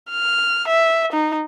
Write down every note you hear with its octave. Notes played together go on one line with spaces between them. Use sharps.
F6
E5
D#4